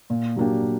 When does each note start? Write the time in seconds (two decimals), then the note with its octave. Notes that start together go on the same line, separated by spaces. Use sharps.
0.10 A#2
0.36 F#3 A#3 D4 G4